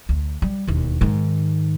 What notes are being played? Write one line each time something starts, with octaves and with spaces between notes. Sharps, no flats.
D2
G3
E1 D#2
G#2 D#3